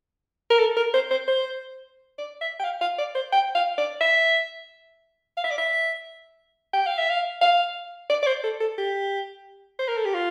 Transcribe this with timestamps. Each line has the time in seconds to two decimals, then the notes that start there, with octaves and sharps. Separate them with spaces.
0.50 A#4
0.59 A4
0.76 A#4
0.94 C5
1.11 C5
1.28 C5
2.18 D5
2.41 E5
2.60 G5
2.64 F5
2.81 F5
2.98 D5
3.15 C5
3.32 G5
3.55 F5
3.78 D5
4.01 E5
5.37 F5
5.44 E5
5.51 D5
5.58 E5
6.73 G5
6.86 F5
6.98 E5
7.10 F5
7.41 F5
8.09 D5
8.23 D5
8.27 C5
8.43 A4
8.60 A4
8.78 G4
9.79 C5
9.88 A#4
9.97 A4
10.05 G4
10.14 F4